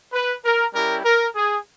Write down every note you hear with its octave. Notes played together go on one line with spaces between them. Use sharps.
B4
A#4
G3 C#4 E4 G4 A#4
A#4
G#4